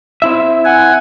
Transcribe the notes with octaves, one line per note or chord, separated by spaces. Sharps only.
C4 E4 E5
F#5 G#5